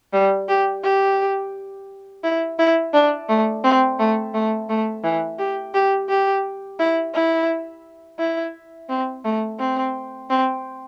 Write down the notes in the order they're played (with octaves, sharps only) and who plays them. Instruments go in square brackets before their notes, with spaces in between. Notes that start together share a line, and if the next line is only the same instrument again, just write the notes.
[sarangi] G3
G4
G4
E4
E4
D4
A3
C4
A3
A3
A3
E3
G4
G4
G4
E4
E4
E4
C4
A3
C4
C4